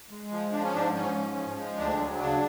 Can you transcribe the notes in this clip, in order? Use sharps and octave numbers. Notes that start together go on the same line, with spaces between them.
G#3
F3
F3 D4
C#4
G#2 D4
G#2 C#4
F3
F3
G#3
D2 D4
F#3
C#3 D4